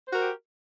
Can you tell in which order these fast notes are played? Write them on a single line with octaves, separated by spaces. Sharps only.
C5 F#4 A#4 G4